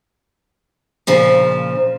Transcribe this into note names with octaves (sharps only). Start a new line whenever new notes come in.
A#2 C#3 F3